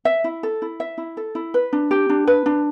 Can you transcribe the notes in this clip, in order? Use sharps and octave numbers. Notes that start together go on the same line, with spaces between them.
E5
E4
A4
E4
E5
E4
A4
E4
B4
D4
G4
D4
B4
D4